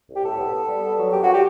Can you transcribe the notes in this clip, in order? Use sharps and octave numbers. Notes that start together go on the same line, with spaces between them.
C2
G4
A2 A4
B3
B3
G3
B3
F#3
F#2 G4
F#4
G4